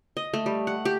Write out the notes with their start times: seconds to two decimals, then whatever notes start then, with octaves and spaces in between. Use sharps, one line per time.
0.17 D#5
0.34 A3
0.46 G3
0.67 F#5
0.85 G4